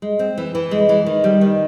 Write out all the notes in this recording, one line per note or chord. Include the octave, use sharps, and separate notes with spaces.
G#3
C4
E3
E3
G#3
E3
D#3
G3
D#3